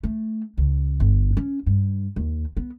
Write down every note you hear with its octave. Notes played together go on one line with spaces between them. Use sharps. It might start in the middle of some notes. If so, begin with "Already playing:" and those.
A3
C#2
G1
C#4
G2
D#2
B3